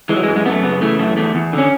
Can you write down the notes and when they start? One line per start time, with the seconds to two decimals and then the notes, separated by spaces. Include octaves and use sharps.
0.09 E3 G#3
0.16 F#3
0.23 G#3
0.28 F#2
0.36 G#3
0.45 F#2 B3
0.50 A3
0.63 C#3 B3
0.81 E3 A3
0.99 F#2 A3
1.17 E2 A3
1.35 E2
1.53 D3 C#4